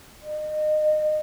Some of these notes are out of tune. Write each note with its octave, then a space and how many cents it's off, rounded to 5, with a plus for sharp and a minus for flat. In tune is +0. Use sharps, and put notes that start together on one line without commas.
D#5 -30